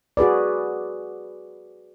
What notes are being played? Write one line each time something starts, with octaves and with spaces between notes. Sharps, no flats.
F#4 G#4 B4 D5